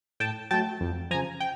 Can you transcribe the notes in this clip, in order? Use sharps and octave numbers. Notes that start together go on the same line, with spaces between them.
A2 G5 A5
F#3 A3 G5 A5
F2
C#3 F3 G#5 A#5
G5